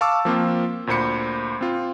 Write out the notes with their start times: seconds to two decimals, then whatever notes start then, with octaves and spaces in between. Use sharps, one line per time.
0.01 F5 A5 C#6 D6 E6
0.25 F3 A#3 C4 F4
0.87 D2 A#2 C5 B5 C#7
1.61 C4 F4